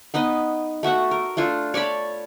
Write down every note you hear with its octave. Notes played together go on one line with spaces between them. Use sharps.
B3 D#4 B4 D#5
A3 F#4 E5 F#5
A#4
A3 D4 F4 A4
C#5 D5 A5 B5